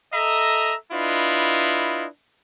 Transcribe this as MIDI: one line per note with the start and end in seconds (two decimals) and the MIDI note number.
0.14 0.74 69
0.14 0.74 75
0.14 0.74 76
0.14 0.74 82
0.93 2.07 62
0.93 2.07 64
0.93 2.07 65
0.93 2.07 71
0.93 2.07 75